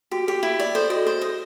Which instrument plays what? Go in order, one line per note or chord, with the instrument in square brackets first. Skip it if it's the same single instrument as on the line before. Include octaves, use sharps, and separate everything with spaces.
[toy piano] F#4 [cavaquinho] G4
[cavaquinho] G4 [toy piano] G#4
[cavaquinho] E4
D5
[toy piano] A4 [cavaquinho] C5
[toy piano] F#4 [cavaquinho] D#5
[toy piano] G#4 [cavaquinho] C5
[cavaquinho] D#5